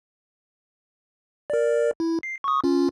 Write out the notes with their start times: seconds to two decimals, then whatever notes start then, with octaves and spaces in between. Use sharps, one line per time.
1.50 A#4 D5
2.00 E4
2.23 C7
2.44 C#6 D#6
2.64 C#4 F4